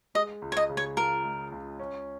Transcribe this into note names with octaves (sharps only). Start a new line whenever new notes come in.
G#3 D#5
C#2
C#5
D#5
C#3
C#5
F4 A#4
G#3
C#2
C#4